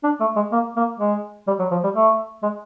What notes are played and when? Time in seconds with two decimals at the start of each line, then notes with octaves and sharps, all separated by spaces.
0.04 D4
0.20 A3
0.36 G#3
0.52 A#3
0.76 A#3
1.00 G#3
1.47 G3
1.59 F#3
1.71 F3
1.83 G3
1.94 A3
2.43 G#3